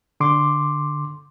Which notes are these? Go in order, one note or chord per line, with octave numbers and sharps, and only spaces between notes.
D3 C6 D6